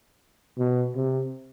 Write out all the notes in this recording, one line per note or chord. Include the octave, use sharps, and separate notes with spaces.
B2
C3